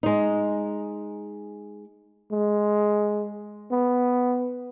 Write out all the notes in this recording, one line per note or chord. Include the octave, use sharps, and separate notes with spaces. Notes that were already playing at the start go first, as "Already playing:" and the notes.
G#3 D#4
G#3
B3